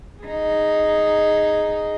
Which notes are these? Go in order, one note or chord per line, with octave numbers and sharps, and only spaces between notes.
D#4 G#4